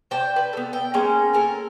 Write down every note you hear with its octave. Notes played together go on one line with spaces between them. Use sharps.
C5 D5 G5 A5
B4
B3 A4
G5
G#3 A#3 C#4
A4 A#4 G#5